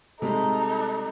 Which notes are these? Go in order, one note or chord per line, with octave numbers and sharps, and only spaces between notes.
C3 G3 G#3 D#4 A4